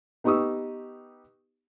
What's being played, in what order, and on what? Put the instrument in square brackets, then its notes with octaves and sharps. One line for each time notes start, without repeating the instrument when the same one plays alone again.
[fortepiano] B3 D#4 G4 C#6 D#6 E6